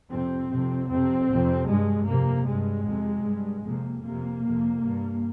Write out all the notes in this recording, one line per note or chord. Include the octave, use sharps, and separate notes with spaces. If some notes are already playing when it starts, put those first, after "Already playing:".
F2 C3 C4
F2 C3
F2 C3 C4
F2 C3
G2 G#3
F2 C3 A#3
G2 G#3
F2 C3
G2
F2 C3 A#3
F2 C3 A#3
F2 C3
G2